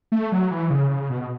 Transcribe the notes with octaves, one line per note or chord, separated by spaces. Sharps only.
A3
F#3
E3
C#3
C#3
B2